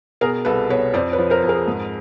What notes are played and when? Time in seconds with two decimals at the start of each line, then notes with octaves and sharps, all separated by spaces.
0.21 B2 G#4 A#4
0.45 C2 A4 B4
0.69 B2 B4 C#5
0.94 F2 C5 D5
1.12 B4 C#5
1.18 F3
1.30 A#4 C5
1.43 F2
1.49 G#4 A#4
1.68 G#2